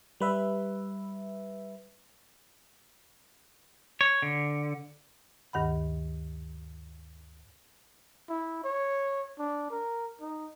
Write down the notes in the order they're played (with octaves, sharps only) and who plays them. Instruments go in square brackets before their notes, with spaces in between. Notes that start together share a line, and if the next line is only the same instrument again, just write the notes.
[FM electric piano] G3 B4 E5
[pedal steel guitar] C#5
D3
[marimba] D2 G2 D#3 F#5 B5
[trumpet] E4
C#5
D4
A#4
D#4